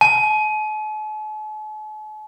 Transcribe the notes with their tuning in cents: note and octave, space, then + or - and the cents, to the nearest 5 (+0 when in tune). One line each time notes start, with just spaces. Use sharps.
A5 -45